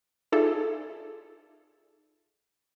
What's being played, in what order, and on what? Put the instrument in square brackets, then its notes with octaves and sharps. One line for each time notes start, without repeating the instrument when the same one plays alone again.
[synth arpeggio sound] D#4 F4 G#4 A4 D5 E5